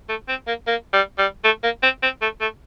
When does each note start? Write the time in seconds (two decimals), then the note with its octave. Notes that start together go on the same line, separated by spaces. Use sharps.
0.09 A3
0.29 C4
0.47 A#3
0.67 A#3
0.93 G3
1.18 G3
1.44 A3
1.63 A#3
1.83 C4
2.03 C4
2.22 A3
2.41 A3